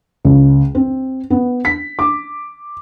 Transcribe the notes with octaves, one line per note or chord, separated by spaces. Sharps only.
C#2
C4
B3
B6
D6